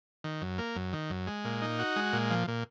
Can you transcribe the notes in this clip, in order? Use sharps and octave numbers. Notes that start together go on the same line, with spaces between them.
D#3
F#2
A#3
F#2
D#3
F#2
G#3
A#2
D#4
F#4
G#3
A#2
F3
A#2